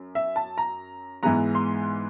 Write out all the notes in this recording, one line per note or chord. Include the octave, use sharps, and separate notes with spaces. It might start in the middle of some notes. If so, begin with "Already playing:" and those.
Already playing: F#2
E5
A5
A#5
G#2 E3 G#3 B3 A#5
C6